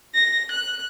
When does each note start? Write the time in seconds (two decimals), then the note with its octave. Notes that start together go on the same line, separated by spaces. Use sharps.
0.15 A#6
0.52 F#6